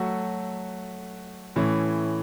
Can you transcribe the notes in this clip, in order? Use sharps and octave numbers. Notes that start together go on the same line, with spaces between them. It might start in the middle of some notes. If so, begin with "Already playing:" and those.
Already playing: F#3 A3 F#4 A4
A2 E3 C#4